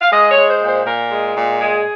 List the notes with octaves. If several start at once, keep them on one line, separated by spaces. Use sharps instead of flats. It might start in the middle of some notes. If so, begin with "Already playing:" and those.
F5
G#3 D#5
C#5
G#3
C5
A#2
C5
A#2 A#4
G#3
A#2
G#3 G#4